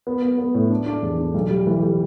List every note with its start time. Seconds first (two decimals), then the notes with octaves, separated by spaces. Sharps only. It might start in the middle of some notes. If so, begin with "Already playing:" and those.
0.07 B3
0.22 B3
0.38 B3
0.54 A2
0.70 D4
0.86 D4
1.02 E2
1.18 D4
1.34 B1
1.50 G3
1.67 E3
1.82 G3